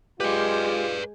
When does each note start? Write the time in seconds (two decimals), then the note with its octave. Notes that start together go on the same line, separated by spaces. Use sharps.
0.20 G#3 F4 G4 B4 D5